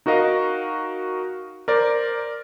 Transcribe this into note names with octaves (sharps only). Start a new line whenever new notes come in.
D#4 F#4 A#4 D#5 F5
A#4 C5 D5